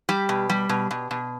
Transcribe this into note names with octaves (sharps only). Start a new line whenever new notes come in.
G3 G4
B2
G3
B2
B2
B2